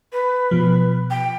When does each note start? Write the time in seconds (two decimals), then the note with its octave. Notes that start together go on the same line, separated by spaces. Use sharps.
0.12 B4
0.51 B2 F3
1.10 G5